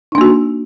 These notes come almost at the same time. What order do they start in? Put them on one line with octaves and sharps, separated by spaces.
D#4 D4 A#3 F#4